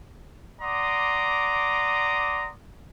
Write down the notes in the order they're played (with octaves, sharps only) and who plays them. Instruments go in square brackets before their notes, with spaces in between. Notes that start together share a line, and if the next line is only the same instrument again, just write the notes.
[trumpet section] D5 F#5 A#5 C6 D6 D#6